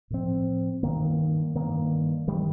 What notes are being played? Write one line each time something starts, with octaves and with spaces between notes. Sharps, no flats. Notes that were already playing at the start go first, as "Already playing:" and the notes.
A2 F3 C4
G2 D#3 A#3
G2 D#3 A#3
G2 D#3 G3